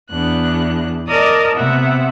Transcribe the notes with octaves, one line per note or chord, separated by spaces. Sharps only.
E2 B3 D4 F#6
A#4 D5 D#5 A5 D6 D#6
C3 B3 E5 F#5